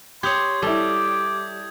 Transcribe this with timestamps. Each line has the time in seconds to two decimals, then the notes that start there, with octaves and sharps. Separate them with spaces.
0.23 G4 C#5 C6 D#6 G6 G#6
0.62 G3 E4 A4 D6